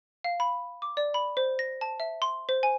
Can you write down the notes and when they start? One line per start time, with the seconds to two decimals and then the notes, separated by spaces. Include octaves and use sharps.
0.24 F5
0.40 B5
0.82 D6
0.97 D5
1.14 B5
1.37 C5
1.59 A#6
1.81 A5
2.00 E5
2.22 C6
2.49 C5
2.63 G#5